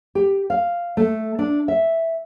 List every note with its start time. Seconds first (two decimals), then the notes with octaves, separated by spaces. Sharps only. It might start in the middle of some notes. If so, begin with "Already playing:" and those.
0.15 G4
0.50 F5
0.97 A3
1.39 D4
1.68 E5